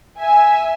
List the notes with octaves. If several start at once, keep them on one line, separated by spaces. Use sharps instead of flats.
E5 G#5